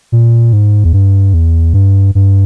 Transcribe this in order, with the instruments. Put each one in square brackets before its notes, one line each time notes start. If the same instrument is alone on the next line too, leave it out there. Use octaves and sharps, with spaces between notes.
[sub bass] A#2
G#2
E2
G2
E2
G2
G2